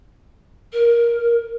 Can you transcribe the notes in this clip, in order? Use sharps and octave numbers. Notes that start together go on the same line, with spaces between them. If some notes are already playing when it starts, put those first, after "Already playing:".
A#4